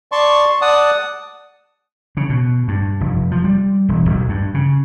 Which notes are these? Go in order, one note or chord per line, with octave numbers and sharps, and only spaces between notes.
D5 A5 C6 C#6
D5 F#5 A5 D#6
C#3
B2
G2
F1
F3
G3
E1
B1
G2
C#3